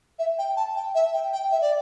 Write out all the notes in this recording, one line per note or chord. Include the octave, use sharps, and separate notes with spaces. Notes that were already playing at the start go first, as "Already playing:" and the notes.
E5
G5
A5
G5
E5
G5
G5
E5
D5